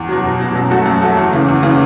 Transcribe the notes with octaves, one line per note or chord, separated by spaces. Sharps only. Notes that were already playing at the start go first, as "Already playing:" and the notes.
Already playing: E2
B2 F#3
E2
B2 F#3
F#2
F#3 A3 F#4 A4
F#2
F#3 A3 F#4 A4
E2
C#3 E3
E2
C#3 E3